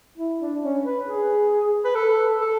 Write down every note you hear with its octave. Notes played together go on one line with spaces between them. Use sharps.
E4
D4
C#4
B4
G#4
B4
A4
A4